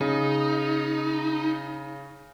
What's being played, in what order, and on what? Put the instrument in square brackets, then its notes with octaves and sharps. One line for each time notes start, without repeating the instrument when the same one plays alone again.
[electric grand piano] C#3 [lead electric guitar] D#4